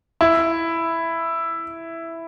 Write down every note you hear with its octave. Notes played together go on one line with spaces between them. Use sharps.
E4